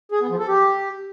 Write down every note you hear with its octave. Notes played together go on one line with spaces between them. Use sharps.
G#4
B3
F3
A4
G4